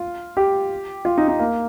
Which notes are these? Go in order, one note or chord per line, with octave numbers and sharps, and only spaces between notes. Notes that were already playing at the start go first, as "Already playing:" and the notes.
Already playing: F4
G4
F4
D#4
D#4
A#3